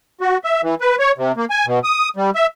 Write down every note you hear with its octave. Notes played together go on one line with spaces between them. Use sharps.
F#4
E5
E3
B4
C#5
C3
A#3
G#5
B2
D#6
G3
E5